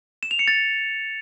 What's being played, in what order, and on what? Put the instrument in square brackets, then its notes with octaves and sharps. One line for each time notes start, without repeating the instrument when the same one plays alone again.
[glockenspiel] E7
F7
C#7
A6